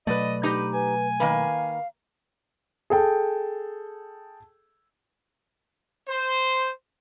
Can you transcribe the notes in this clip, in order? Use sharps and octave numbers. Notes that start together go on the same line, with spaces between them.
B2 F#3 A3 B4 D5 D#5
D#4 G4 B4 A#5
B4 G#5
D#3 A#3 B4 F5
G#4 A4 G5
C5